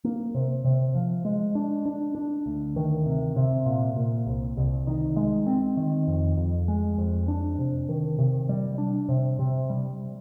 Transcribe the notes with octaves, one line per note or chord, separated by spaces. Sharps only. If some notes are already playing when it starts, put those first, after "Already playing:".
A#3
C3
C3
F3
G#3
D4
D4
D4
D2
D#3
C3
C3
A#2
A#2
C2
C2
D#3
G#3
C4
D#3
F2
F2
G#3
F2
D4
C3
D#3
C3
G3
D4
C3
C3
G3